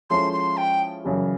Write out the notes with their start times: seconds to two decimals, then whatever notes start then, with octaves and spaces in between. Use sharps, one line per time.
0.10 F3 G#3 C#4 E4 A4 C6
0.33 C6
0.57 G5
1.04 F#2 C#3 E3 G3